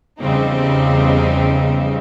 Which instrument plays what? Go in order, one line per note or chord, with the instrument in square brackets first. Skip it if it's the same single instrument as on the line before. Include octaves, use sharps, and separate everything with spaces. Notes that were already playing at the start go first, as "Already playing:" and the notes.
[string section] E2 C#3 F3 G3 C4 D#4